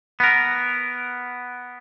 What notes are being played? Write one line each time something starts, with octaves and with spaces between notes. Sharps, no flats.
B3 A#4